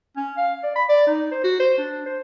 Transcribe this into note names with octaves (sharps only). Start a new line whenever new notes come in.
C#4
F5
D5
B5
D5
D#4
C5
F#4
C5
D4
C5